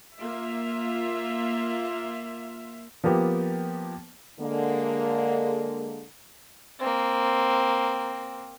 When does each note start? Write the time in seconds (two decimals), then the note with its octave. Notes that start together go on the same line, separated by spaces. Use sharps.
0.19 A#3 F4 E5
3.04 F3 A#3 B3 G4
4.40 D3 G#3 A#3
6.80 A#3 C4